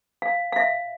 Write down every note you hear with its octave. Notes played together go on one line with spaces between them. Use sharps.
F5
F5
E5